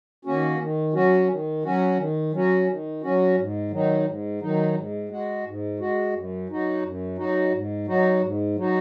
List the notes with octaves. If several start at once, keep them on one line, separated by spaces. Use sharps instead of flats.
D#3 A#3 C#4 F#4
D#3
F#3 C#4 F#4
D#3
F#3 C#4 F#4
D#3
F#3 C#4 F#4
D#3
F#3 C#4 F#4
G#2
D#3 F#3 D#4
G#2
D#3 F#3 D#4
G#2
G#3 F#4
G#2
G#3 F#4
F#2
F#3 D#4 F#4
F#2
F#3 D#4 F#4
G#2
F#3 D#4 F#4
G#2
F#3 D#4 F#4